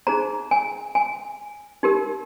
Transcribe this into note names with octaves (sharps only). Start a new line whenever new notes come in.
D#4 G#4 C5 A#5
G#5
G#5
D#4 G4 A#4